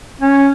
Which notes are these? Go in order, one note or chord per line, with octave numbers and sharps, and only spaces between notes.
C#4